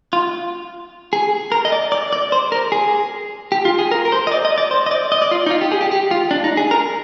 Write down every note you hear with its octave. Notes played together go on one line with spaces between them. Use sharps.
F4
G#4
A#4
D#5
D5
D5
D5
C5
A#4
G#4
G4
F4
G#4
A#4
A#4
C5
D#5
D5
D#5
D5
C5
D#5
D5
D#5
D5
F4
D#4
F4
G4
G#4
G4
G4
F4
D4
D#4
G#4
A#4